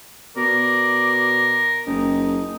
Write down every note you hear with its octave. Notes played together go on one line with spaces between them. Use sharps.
B2 A#4 D5
F#1 D#4